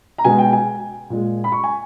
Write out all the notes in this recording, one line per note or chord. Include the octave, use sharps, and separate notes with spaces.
A#5
B2 G#3 G#5
G5
G#5
A#2 G#3
B5
C#6
G#5